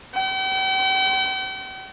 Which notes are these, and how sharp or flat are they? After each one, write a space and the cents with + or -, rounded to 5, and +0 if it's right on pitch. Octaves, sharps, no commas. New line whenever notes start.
G5 -45